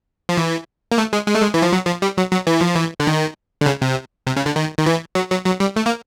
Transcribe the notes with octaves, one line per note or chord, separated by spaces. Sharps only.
F3
E3
A#3
A3
G#3
G#3
A3
G#3
E3
F3
F#3
F3
G3
F#3
F#3
E3
F3
E3
D3
D#3
D3
C#3
C3
C3
C#3
D3
D#3
D#3
E3
F#3
F#3
F#3
G3
A3
A#3